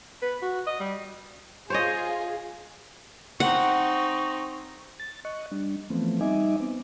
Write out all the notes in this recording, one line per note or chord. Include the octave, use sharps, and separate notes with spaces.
B4
F#4
D#5
G3
F4 G#4 C5 C#5 D#5
C4 D#4 F#5 C#6
A6
D#5 C#6 F#6
G3 D4
E3 F3 A3 B3 C4
G3 D#4 D#5 E5 G#5 D6
B3 C4